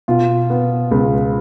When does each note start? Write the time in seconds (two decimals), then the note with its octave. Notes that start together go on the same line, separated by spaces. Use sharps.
0.08 B2 F4
0.50 B3
0.91 C#2